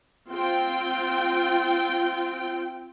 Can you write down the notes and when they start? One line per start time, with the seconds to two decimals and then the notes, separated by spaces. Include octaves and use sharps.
0.29 C4 F4 G5